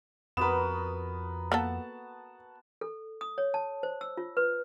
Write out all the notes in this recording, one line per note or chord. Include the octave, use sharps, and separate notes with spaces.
F2 B3 F#4 A#4 B4 E7
A#3 B3 A4 F#5 A5
A4
D#6
C#5
A5
C5
E6
F4
B4